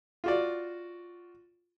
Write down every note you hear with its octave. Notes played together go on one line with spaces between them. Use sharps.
F4 F#4 D5